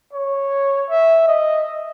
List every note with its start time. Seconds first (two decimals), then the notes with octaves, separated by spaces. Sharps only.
0.13 C#5
0.90 E5
1.27 D#5